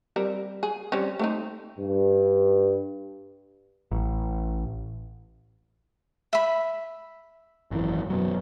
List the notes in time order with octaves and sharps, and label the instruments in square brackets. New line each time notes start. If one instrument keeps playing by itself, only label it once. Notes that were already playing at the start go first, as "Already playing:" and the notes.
[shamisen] G3 C4 A#4
G#4
G3 C4 C#4
A3 C4 D#4
[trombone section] G2
[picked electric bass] A1
[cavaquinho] E5 B5
[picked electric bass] G#1 F#2 E3
F#2 B2 F#3